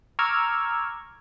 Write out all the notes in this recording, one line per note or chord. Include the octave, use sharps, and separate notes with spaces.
A#5 C#6 D6 E6 F6 G#6